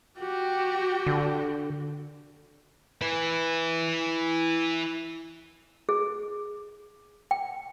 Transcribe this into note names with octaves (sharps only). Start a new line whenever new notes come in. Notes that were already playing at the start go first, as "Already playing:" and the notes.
F#4 G4
D3
E4 B4
G#4
G5